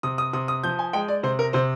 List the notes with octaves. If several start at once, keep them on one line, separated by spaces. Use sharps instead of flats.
C3 D#6
D#6
C3 D#6
D#6
F3 G6
G#5
G#3 G5
D5
C3 C5
A#4
C3 C5